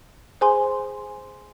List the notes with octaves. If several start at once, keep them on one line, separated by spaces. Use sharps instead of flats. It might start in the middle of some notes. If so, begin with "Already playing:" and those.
G#4 C5 G#5 C6